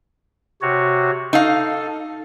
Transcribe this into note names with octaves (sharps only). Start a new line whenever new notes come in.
C3 F#4 C#5
D#4 A4 F5